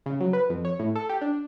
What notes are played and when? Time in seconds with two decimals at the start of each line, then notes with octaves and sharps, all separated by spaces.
0.06 C#3
0.20 F#3
0.33 B4
0.50 F2
0.65 C#5
0.79 A2
0.95 A4
1.09 G4
1.21 D4